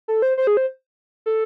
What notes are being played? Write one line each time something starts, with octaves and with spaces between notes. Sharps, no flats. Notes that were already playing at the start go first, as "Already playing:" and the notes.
A4
C5
C5
G#4
C5
A4